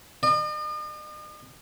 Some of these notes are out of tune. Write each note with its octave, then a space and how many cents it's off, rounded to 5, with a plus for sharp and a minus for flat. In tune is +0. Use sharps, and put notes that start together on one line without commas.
D#5 -45